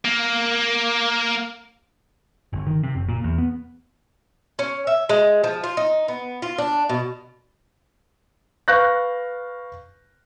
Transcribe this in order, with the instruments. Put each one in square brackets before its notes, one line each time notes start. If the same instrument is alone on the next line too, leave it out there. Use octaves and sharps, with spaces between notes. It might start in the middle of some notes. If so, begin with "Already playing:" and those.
[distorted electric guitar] A#3
[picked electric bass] G1
D#3
C3
F#1
A#2
E2
B3
[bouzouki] C#4
E5
G#3
F3
F4
D#4
B3
F4
D4
B2
[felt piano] B4 F5 C#6 F#6 G6 A#6